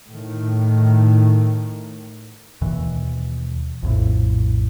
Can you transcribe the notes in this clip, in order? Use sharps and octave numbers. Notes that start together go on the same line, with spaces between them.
A2 D#3
D#2 B2 E3
A#1 F2 A2